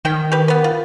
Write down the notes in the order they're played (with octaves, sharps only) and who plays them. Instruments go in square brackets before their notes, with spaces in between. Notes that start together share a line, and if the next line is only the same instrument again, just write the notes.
[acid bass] D#3 [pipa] D#4 G5
[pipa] G4 B4
B3 B4
F4